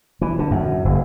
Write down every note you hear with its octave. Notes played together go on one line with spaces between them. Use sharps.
E3
D3
F#2
F#1